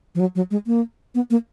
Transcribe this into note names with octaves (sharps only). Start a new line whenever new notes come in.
F3
F#3
F#3
G#3
A#3
B3
A#3